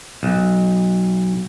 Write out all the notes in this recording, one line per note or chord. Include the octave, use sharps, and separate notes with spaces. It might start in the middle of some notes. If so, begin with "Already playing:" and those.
B1